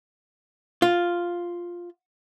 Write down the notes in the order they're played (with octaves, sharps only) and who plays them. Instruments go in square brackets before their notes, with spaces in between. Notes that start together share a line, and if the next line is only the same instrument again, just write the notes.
[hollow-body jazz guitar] F4